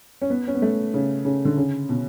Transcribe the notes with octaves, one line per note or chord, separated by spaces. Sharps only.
C#4
B3
C#4
B3
A3
C#3
C#3
D3
C#3
B2